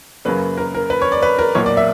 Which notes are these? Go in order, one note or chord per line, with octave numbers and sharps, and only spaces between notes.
F#2 C#3 F#3 A#3 B4
A#4
A#4
B4
C#5
D5
B4
A#4
B1 A#2 A#3 C#5
D5
E5